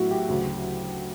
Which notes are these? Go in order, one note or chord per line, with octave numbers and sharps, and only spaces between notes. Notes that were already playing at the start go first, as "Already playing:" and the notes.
Already playing: A2 F#3 B3 E4 F#4
G4
D2 C#3 F#3